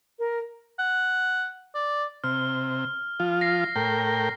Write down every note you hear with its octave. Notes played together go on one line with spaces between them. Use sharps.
A#4
F#5
D5
C3 F6
F3 F4
A#6 C7
A2 A#4 G5